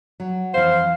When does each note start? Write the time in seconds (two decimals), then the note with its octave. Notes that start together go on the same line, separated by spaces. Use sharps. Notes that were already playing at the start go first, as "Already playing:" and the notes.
0.20 F#3
0.54 F2 E3 C5 F5